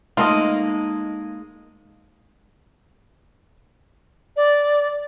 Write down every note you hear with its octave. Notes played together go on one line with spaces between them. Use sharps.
G#3 A#3 D#4 F4 A4 D#5
D5